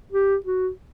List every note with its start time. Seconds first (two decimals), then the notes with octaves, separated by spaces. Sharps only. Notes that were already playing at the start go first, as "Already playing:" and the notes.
0.13 G4
0.46 F#4